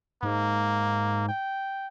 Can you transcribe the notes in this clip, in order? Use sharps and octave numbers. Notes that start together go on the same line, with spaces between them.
G#2 A#3
G5